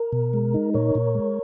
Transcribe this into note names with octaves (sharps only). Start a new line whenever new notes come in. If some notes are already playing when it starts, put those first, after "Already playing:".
Already playing: A#4
B2
G#3
D#4
A#2 A#4 C#5
A#2
G#3